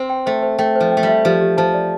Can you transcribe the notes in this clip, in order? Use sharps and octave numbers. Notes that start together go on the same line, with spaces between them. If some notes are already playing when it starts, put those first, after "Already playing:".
Already playing: C4 C5
G5
A3 C5
C5
A3 G5
F3 C5
G5
A3
G3
E5
F3 G4
G4
F3 A5
D5